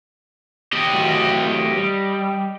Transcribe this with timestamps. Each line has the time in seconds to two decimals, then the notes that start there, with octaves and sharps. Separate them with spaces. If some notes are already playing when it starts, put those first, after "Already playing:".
0.73 G4 D#5
0.93 A2 F#3 F#4
1.77 G3